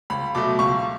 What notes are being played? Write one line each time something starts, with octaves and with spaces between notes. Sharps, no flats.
C#2 B5
B2 F#3 A3 D6
C#2 C#6